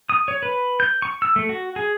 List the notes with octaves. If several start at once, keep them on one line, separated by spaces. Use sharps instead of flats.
D#6
C#5
B4
G6
C#6
E6
A3
F#4
G#4